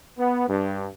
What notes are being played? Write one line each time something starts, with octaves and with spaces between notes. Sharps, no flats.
B3
G2